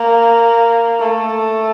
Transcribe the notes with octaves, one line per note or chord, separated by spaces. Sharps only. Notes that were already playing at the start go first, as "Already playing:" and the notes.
Already playing: A#3
A3